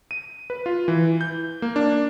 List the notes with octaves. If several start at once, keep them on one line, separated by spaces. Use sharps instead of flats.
D#7
B4
F4
E3
G6
A#3
D4